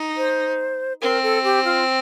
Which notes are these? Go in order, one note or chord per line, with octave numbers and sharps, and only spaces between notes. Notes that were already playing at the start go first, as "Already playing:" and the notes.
Already playing: D#4
C5
C4 A#4
A4
G4
F4